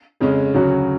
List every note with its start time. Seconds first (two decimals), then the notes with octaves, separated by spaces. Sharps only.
0.20 F2 C#3 G#3 C#4
0.54 D2 C#3 F#3 C#4 F#4